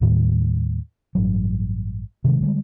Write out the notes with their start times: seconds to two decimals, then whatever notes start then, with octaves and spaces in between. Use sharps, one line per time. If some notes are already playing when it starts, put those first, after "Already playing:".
0.01 D#2 A2 D#3 G3
1.15 A1 G2 F#3
2.24 C3 D#3 G#3
2.41 D3 G3 G#3